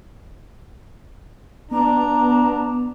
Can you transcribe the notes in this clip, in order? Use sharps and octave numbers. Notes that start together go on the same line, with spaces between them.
B3 D4 A#5